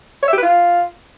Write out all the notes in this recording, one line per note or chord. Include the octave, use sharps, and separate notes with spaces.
C#5
E5
G4
B4
F4